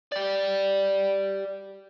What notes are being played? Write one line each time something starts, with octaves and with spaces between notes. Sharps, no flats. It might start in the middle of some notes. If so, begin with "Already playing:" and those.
G4 D5